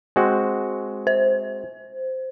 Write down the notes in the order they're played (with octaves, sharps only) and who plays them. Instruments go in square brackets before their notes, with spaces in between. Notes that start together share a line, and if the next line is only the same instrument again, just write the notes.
[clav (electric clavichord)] G#3 C4 F#4
[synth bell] C5